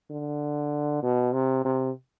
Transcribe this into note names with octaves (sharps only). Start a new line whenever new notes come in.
D3
B2
C3
C3